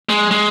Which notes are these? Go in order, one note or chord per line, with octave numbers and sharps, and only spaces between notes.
G#3
G#3